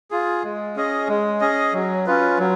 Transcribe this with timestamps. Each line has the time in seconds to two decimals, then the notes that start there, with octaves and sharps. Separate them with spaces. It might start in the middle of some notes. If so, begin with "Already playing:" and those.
0.11 F4 G#4
0.44 G#3
0.76 C#4 G#4 D#5
1.08 G#3
1.41 C#4 G#4 D#5
1.73 F#3
2.06 C#4 F4 B4
2.39 F#3